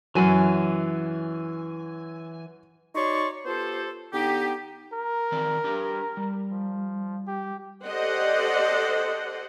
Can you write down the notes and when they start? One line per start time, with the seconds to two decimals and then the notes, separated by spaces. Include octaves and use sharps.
0.15 F#2 E3 F#3 G#5
2.95 D#4 F#4 C#5 D5 C6 C#6
3.45 B3 F4 G4 A4 C5
4.12 D3 B3 D#4 G4
4.93 A#4
5.32 D#3 C4 D5
5.64 D4 G4
6.17 G3
6.51 F3
7.27 G4
7.85 G4 A4 C5 D5 D#5 F#5